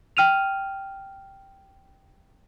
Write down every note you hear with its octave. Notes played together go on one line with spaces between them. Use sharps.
G5 F6 D#7 F7